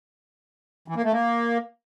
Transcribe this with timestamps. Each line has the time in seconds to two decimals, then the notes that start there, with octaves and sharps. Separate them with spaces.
0.88 E3
0.96 A#3
1.04 A3
1.12 A#3